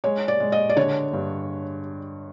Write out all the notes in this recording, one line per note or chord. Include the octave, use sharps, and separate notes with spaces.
G#3 C#5
D5
G#3
D#5
D5
D3 C#5
G2